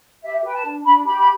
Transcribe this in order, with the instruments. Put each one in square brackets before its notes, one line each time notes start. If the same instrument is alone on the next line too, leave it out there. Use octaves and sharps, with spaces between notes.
[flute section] G4 E5
B4 G5
A5
D4
D4 B5
G4 B5
B5